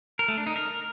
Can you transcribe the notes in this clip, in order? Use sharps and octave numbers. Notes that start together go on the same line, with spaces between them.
A#4
A3
D4
D#4
A#4